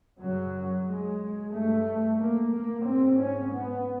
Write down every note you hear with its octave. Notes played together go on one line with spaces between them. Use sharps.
F#2 C#3 F#3
G#3
G2 A3
A#3
A#3
G#2 C4
C#4
B3